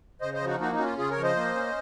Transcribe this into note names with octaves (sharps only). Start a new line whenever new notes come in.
C#3 C5 D#5
C5 D#5
F3
D#4 F#4
A#3 D#4 F#4
D#4
C#4 F#4
F4
C#3 F4 G#4
A#4 C#5
F3
C5 D#5
A#3
C#4